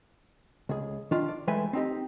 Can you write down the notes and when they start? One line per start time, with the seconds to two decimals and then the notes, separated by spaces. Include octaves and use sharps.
0.69 C#2 G#4
1.11 D#3 D4 F4
1.28 D5
1.47 E3 G#3 A3 B4 G#5
1.73 C4 D#4 G4